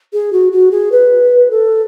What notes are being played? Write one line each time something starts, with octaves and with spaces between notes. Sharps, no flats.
G#4
F#4
F#4
G#4
B4
A4